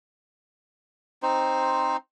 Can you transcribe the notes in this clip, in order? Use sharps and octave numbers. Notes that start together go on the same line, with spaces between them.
C4 D#4 C5